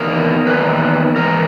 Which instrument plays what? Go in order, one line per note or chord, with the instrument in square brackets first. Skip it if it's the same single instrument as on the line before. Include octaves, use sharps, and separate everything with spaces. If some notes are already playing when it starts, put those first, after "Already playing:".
Already playing: [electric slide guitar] E2 D#3 A#3 A#4
E2 D#3 A#3 B4
G#2 E3 A#4